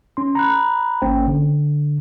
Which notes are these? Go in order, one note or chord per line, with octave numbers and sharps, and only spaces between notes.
C#4 C6
A#5 B5 F#6
G#1 A#3 C#4 C5 G5
D3